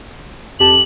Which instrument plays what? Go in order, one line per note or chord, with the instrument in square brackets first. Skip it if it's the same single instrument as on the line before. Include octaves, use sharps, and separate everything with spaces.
[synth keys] F2 G4 A5 [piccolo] F#7